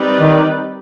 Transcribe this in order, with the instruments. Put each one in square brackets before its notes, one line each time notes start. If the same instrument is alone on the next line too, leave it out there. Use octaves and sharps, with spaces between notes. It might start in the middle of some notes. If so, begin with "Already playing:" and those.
Already playing: [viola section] G3 C4 D#4 B4 D5
[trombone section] D#3